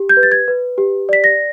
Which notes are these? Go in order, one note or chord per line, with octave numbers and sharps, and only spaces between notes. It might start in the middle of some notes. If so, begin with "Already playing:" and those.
Already playing: G4
G6
B4
A6
G#6
B4
G4
D5 B6
A#6